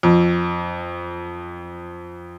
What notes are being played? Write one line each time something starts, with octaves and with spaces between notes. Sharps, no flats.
F2